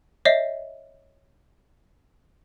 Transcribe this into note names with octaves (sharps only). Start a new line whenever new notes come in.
C#5 D#5 E5 C7